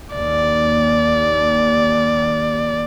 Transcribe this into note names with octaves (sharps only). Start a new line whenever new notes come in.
D#2 D5